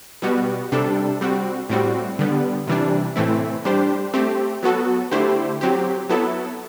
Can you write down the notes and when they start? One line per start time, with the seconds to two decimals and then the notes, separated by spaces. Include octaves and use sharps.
0.22 B2 G3 B3 F#4
0.72 C3 G3 D4 A4
1.21 G3 C4 F#4
1.69 A2 G3 C4 F#4
2.19 D3 G3 B3
2.67 C3 E3 G3 D4
3.16 A2 E3 A3 C4 E4
3.65 G3 D4 G4 C5
4.13 A3 C4 G4
4.63 F#3 B3 F#4 A4
5.11 D3 A3 E4 G4 C5
5.61 F#3 C4 G4
6.09 F#3 B3 E4 A4